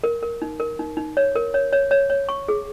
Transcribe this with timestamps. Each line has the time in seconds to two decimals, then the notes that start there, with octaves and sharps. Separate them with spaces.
0.04 A#4
0.23 A#4
0.42 D#4
0.60 A#4
0.79 D#4
0.97 D#4
1.17 C#5
1.36 A#4
1.54 C#5
1.73 C#5
1.91 C#5
2.10 C#5
2.29 C#6
2.48 G#4